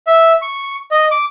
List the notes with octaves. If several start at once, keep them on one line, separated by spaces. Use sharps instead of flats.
E5
C#6
D#5
D6